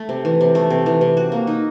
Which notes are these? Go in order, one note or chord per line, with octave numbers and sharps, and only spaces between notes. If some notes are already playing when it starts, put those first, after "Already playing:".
Already playing: A3
C3
E3
C3
A3
C3
E3
C3
F#4
A#3
D#4